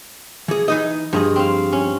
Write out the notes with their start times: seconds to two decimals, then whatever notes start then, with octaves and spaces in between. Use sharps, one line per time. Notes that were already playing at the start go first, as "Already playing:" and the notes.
0.48 E3 G#4
0.68 E3 D#4 D#5
1.13 G2 F3 G#4 D#5
1.36 C4 F5
1.73 C#4